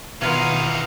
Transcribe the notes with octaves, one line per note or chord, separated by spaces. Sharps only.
B2 D#3 E3 F#3 B3 D#4 F4 F5